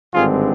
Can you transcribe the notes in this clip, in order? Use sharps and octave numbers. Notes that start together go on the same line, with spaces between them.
G#1 G2 D3 G#3 C4 F4 G#4